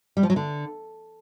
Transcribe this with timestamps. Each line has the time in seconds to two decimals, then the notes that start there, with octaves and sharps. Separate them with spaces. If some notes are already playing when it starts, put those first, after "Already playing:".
0.17 G3
0.23 F3
0.30 F#3
0.36 D3